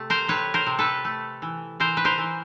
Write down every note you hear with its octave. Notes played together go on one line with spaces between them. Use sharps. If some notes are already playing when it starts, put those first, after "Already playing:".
Already playing: C3 A3
A#4 C5
C3 B4 C#5
A#4 C5
C3
A4 B4
A3
E3
E3 A#4 C5
B4
A#4 C5
E3